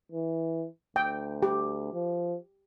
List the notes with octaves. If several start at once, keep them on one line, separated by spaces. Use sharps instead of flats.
E3
D2 G5
G4
F3